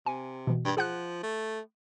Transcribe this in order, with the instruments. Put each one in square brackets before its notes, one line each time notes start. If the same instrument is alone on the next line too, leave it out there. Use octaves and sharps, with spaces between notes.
[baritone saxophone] C3 [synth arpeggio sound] G#5
[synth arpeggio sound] B2 E3
[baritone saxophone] G2
[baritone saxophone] F3 [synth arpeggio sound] G#4 F#5 F#6
[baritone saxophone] A3